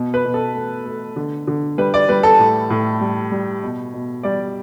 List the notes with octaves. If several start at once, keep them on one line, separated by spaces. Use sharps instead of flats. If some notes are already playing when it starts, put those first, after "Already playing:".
Already playing: B2
B4
B2
A4
A3
A3
D3
D3
G3 B4
D5
G3 B4
A4
A2
A2
G3
G3
B2
B2
G3 D5